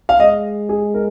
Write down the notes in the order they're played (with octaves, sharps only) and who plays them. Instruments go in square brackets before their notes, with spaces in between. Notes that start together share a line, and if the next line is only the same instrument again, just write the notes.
[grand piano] F5
[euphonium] G#3 [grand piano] D#5
[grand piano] G#4
A#4